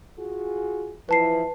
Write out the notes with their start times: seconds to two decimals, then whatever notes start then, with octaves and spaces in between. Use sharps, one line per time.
0.19 F4 F#4 G#4
1.09 E3 F3 E4 B4 A5 C7